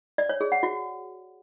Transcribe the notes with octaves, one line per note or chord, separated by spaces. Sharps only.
D5
C#5
G#4
F#5
F#4